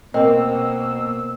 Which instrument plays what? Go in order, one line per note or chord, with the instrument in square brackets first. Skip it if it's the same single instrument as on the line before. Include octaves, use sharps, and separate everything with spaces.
[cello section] B2 A#3 [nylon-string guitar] C4 [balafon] A#4 D#5 [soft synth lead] E6